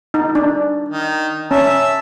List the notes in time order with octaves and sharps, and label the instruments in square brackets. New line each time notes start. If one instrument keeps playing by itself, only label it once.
[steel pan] D#4
D4
[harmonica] D#3
[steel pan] C#4 [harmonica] E5 A5